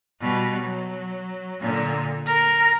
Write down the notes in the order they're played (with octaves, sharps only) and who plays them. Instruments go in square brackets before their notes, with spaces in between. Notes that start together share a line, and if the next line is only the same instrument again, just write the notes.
[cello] B2 G3
F#3
A#2 D3
A#4